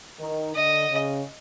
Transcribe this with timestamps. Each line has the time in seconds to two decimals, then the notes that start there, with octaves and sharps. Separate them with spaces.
0.20 D#3
0.54 D3 D#5
0.90 C#3